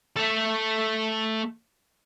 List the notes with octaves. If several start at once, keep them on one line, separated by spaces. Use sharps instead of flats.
A3 A4